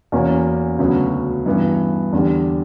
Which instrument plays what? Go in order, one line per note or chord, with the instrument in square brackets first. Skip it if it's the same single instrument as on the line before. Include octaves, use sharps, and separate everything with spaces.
[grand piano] E2 B2 A#3 C#4
D2 C#3 F#3 B3
G2 E3 B3
E2 D3 G3